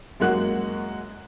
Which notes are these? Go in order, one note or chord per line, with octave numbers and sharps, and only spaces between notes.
F#2 G#3 A#3 F#4 F#6